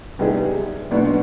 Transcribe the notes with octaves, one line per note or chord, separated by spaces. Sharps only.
C3 G3 B3 D#4 G#4
B1 B2 B3 D4